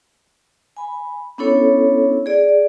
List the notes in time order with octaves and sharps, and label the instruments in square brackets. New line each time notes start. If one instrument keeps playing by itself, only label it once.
[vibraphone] G#5 B5
B3 C#4 D4 E4 A4 C#5
G#4 D5